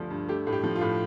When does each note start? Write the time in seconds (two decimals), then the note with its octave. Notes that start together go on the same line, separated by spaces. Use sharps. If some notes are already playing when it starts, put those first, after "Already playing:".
Already playing: D2 G2 F3 A3
0.10 G2
0.29 A3 G4
0.47 A2
0.52 G4
0.63 F3
0.75 F4
0.81 A2